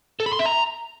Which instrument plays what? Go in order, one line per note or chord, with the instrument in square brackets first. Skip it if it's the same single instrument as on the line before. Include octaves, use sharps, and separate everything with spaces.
[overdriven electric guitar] A4
B5
C6
E5
A#5